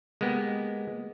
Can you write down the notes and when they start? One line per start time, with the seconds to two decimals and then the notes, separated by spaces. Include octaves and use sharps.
0.21 G#3 A#3 B3 G4